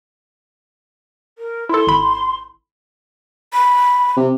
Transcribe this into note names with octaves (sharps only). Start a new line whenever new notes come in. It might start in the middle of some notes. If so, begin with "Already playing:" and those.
A#4
E4 A4 C6
G#1 B5
B5
C3